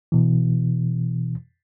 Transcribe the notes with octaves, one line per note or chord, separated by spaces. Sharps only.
B2 E3